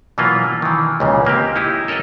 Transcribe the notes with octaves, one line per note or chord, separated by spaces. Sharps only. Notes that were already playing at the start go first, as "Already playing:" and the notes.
B2 E3 F#3 A#3 B3 F4
D#3 E3
C#2 A#2 C#3
G#3 A#3 C4 G4
D#4 E4 G4
A4 A#4 C#5 D#5 F#5